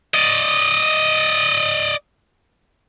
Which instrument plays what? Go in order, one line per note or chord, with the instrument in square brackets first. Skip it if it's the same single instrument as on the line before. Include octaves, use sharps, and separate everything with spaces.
[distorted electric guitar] D5 D#5